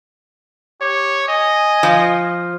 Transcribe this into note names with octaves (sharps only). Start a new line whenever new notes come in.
G4 C#5
D#5 G#5
F3